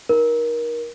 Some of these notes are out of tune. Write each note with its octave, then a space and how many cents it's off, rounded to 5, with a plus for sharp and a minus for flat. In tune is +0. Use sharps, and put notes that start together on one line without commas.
D#4 +0 A#4 +25